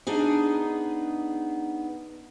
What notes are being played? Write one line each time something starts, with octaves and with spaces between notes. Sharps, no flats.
B3 D4 D#4 G#4